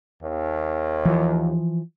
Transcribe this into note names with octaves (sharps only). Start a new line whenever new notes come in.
D#2
E3 F3